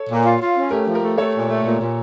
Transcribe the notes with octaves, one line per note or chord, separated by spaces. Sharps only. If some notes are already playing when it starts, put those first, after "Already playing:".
Already playing: A4 C#5
A#2
F4
F4
C#4
A3 G4 A#4
F3
G4 A#4
A3
A3 A4 C#5
A#2
A3
A#2
A#2